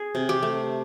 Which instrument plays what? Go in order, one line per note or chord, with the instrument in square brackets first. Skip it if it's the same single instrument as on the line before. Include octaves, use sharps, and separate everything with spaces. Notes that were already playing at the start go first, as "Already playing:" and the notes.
Already playing: [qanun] G#4
C3
G4
A3